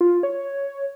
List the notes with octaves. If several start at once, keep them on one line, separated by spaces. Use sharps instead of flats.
F4
C#5